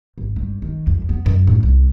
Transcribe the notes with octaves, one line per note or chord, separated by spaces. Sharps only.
G#1
G2
D#3
F2
B3
F#2
A2
C2